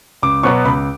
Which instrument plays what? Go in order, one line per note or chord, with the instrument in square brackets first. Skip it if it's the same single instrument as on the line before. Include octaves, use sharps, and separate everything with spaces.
[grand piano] C#2 D6
B2 F#3 B3 C#6
C#2 B5